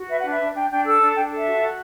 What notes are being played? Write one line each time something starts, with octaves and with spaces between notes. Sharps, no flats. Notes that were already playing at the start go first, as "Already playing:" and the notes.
Already playing: F#4
B4 E5
F#5
D4
E5
D4
D4 G5
D4 G5
A4 E6
D4
D4 G5
A4 E5
F#4
F#4